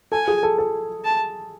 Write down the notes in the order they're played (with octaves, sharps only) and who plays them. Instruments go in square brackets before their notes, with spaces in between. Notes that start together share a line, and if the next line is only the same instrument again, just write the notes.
[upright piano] A4 [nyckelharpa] G#5
[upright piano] G#4
A4
A4
[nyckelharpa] A5